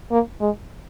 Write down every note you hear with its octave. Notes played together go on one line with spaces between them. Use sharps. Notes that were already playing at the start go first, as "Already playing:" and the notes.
A#3
G#3